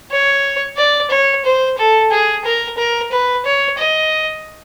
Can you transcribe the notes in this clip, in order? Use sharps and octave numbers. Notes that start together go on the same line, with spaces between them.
C#5
D5
C#5
C5
A4
G#4
A#4
A#4
B4
C#5
D#5